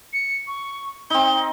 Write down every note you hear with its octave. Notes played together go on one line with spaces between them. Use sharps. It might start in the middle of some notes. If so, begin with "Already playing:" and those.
C#7
C#6
C4 D#4 G7